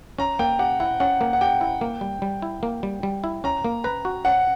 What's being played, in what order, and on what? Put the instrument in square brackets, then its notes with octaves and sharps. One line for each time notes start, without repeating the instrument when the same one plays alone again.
[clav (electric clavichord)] C#4 [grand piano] A#5
[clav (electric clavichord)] A#3 [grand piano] G5
[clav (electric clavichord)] G4 [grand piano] F#5
[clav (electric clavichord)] E4 [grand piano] F#5
[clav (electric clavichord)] C#4 [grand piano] F#5
[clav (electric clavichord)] A#3
[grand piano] F#5
[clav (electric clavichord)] G4 [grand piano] G5
[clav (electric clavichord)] E4
A#3
G3
G3
E4
A#3
G3
G3
E4
[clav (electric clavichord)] C#4 [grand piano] A#5
[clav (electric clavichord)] A#3
[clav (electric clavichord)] B4 [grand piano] A#5
[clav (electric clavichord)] F#4
[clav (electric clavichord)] C#4 [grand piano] F#5